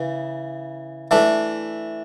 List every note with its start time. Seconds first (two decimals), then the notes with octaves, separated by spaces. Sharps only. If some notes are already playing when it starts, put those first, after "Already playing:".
Already playing: C#3 E3
1.11 E3 A3 D4